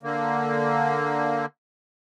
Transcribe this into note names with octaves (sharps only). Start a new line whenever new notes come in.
D3 A#3